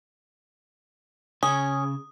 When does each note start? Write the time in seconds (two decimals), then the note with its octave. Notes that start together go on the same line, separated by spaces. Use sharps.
1.43 C#3 C#4 D#6